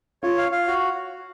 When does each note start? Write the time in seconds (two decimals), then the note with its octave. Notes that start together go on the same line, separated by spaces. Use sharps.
0.23 F4 C#5
0.38 F5
0.52 F5
0.67 F#4